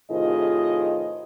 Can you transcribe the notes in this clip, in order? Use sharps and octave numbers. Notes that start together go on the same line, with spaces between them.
A2 C3 D#3 F4 G#4 D#5